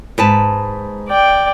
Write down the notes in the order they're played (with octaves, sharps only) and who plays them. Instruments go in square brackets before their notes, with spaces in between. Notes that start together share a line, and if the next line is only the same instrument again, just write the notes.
[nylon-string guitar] G#2 B4 A5
[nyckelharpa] D5 G5